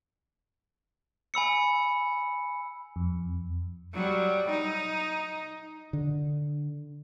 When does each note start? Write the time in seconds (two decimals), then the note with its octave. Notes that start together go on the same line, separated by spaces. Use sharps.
1.34 G#5 B5 E6 C#7
2.96 F2
3.93 F#3 G3
4.50 D#4
5.93 D3